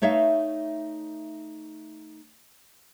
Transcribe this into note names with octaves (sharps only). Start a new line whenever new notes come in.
A3 D#4 C#5 E5 F5